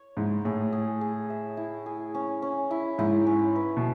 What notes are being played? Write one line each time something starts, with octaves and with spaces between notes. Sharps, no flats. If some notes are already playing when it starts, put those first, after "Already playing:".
Already playing: C#5
G#2 E4
A2 G#4
G#4
G#4
E5
E4
G#4
C#4
C#4
E4
G#2 E4
C#4
B4
B2